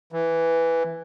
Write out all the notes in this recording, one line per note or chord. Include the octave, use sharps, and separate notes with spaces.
E3